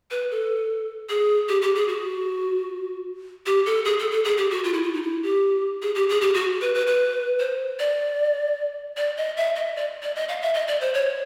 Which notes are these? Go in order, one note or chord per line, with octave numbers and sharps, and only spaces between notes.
B4
A4
G#4
G4
G4
G#4
F#4
G4
A4
G#4
A4
A4
G#4
G4
F#4
F4
E4
F4
D#4
E4
G4
G#4
G4
G#4
G4
F#4
B4
B4
B4
C5
D5
D5
D#5
E5
D#5
D5
D5
D#5
F5
E5
D#5
D5
C5
C#5